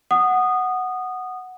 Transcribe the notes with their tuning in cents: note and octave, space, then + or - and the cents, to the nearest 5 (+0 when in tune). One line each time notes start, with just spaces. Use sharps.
F#5 +0 D#6 -15